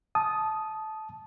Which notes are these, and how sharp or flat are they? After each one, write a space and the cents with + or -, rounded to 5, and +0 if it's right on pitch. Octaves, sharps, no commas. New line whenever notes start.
A5 -15 D#6 +0